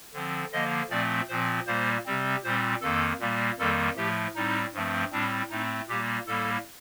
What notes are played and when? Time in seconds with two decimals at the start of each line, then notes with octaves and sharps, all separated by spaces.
0.14 D3 F3 C4
0.52 D3 F3 A#3 D#5
0.90 A#2 F3 A3 C4 D5
1.28 A#2 F3 C4 C5
1.67 A#2 G3 A#3 C5
2.06 C3 G3 C4
2.44 A#2 G3 C4 C5
2.81 F2 D#3 A#3 A4
3.20 A#2 G3 A#3
3.58 F2 D#3 G3 A#3 A4
3.96 A2 F3 A3 G4
4.35 A2 G3 C4 D#4
4.74 G2 F3 A3 C4
5.12 A2 G3 C4 D4
5.50 A2 A3 C4 D#4
5.88 A#2 G3 A#3 G4
6.27 A2 G3 A#3 A4